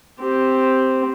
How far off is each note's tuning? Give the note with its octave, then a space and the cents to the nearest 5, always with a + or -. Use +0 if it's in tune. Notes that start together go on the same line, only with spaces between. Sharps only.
C4 +0 G4 +0